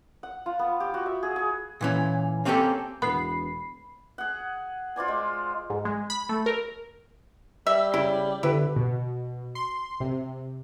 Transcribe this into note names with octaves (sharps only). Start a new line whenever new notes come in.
F#5
F4
B3
G4
F#4
E5
G#4
G#4
A#2 E3 C#4
A#3 C4 C#4 E4 G4 A4
E1 B3 B5 C7
G#4 F#5
F4 C5 D5 G#5
G#3
G#2
G#3
B5
A3
A#4
G3 E5
C#3 E4
D3 E4 G4 B4
B2
C6
C3